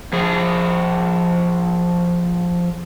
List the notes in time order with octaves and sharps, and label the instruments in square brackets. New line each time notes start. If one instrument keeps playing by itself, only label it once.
[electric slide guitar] F3 G#4